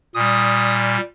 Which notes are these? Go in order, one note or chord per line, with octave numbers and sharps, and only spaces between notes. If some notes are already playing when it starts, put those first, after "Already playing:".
A#2 G3 D#6